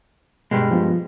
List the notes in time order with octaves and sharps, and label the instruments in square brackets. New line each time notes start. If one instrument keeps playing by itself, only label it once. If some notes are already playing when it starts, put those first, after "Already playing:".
[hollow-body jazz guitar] G2 G3 G#3 [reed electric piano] B2
[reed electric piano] F3 B3 F4